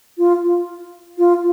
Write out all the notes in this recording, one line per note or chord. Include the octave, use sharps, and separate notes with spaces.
F4
F4